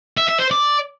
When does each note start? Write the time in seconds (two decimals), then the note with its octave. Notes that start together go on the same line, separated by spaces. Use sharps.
0.17 E5
0.29 E5
0.40 C5
0.51 D5